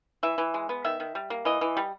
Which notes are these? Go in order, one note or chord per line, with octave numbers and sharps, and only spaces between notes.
E3 E5
E3
G#3
B3
D#3 E5
D#3
G3
A#3
E3 D#5
E3
G3